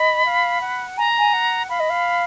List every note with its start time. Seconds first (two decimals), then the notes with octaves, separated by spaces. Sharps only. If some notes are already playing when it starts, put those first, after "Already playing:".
Already playing: D#5 B5
0.25 F5
0.61 F#5
0.97 G#5 A#5
1.18 G#5
1.33 F#5
1.69 F5 B5
1.79 D#5
1.89 F5